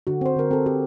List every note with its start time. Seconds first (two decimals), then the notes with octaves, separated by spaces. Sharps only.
0.07 D3 F#4
0.21 C4 C5
0.36 D3 A#4
0.51 C4 A4
0.66 C4 G4